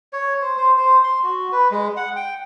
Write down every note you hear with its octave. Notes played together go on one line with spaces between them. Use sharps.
C#5
C5
C5
C5
C6
F#4
B4
G#3
F#5
G5